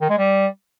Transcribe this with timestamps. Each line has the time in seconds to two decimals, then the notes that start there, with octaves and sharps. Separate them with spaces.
0.02 D#3
0.10 G#3
0.18 G3